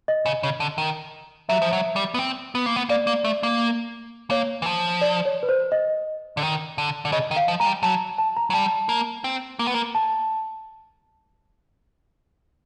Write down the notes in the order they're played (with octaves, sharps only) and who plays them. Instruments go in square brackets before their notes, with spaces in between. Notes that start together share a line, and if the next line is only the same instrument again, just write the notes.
[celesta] D#5
[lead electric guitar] C#3
C#3
D3
D#3
[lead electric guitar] F#3 [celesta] E5
[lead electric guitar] F3
F#3
G3
B3
C4
B3
A#3
B3
[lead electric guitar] A#3 [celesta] D5
[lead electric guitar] A#3
A3
A#3
[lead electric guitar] A#3 [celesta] C#5
[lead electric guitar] E3
F3
[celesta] D5
C#5
B4
C5
D#5
[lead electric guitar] D3
D#3
D3
D3
[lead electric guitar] C#3 [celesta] D#5
[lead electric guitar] D#3
[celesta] F5
[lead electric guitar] F3
[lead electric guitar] G#3 [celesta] A#5
[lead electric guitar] G3
[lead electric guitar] F#3 [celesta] A5
[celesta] A5
A#5
[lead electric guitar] F#3
[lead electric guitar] G3 [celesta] A5
[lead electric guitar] A#3
C4
A#3
B3
A#3
[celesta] A5